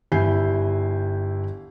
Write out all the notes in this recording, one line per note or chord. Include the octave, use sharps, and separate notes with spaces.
G1 E4 G4 G#5 G6 C7